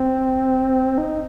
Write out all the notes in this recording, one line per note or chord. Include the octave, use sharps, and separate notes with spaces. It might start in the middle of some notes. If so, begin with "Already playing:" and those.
Already playing: C4
D#4